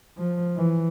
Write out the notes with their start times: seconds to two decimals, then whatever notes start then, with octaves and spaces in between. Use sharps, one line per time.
0.18 F3
0.57 E3